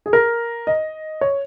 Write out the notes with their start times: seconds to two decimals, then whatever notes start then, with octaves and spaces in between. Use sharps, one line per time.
0.06 G#4
0.13 A#4
0.67 D#5
1.21 C#5